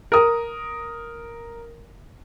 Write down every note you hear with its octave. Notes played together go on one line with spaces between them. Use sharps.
A#4 D#6